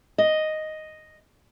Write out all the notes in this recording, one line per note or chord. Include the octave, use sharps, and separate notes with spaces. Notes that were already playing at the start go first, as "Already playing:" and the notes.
D#5